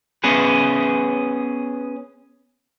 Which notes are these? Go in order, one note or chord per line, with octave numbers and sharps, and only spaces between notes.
B3 C#4 G#4 B4